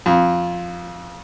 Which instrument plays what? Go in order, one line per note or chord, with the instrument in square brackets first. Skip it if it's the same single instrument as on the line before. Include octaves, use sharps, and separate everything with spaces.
[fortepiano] F2